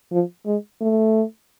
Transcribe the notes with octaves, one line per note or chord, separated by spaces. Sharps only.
F3
G#3
A3